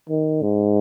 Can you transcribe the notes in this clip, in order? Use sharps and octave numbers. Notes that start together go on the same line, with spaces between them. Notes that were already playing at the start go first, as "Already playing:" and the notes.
D#3
G#2